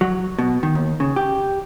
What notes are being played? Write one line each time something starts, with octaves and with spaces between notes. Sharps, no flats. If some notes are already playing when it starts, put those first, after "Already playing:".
F#3
B2
D#3
D#2
C#3
G4